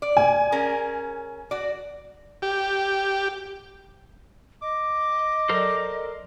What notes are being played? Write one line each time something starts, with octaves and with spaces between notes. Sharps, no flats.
D5
G#5
C#4 G#4 A#4
F#4 D5
G4
D#5 D6
F#3 A4 A#4 C5 D5